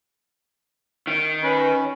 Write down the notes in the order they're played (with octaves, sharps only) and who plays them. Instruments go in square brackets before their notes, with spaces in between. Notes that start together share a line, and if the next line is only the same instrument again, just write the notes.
[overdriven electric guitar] D#3
[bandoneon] C#4 [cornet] B4